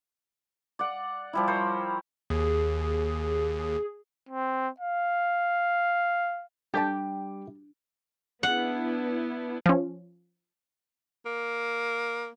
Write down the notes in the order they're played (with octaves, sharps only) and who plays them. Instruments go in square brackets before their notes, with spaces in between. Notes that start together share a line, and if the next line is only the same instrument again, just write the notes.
[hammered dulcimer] D5 F#5
F3 G3 E4
A#4 C5 C#5 B5
[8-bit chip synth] D#2 [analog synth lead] G#4
[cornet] C4
F5
[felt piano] G3 D6 [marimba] D4 [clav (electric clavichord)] G4 [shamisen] A4 D5 A5
[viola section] B3 D4 E4 [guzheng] F#5
[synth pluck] F3 C#4
[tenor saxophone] A#3